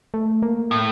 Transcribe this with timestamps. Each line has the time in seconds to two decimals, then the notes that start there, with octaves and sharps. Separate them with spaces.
0.14 A3
0.42 A#3
0.71 A2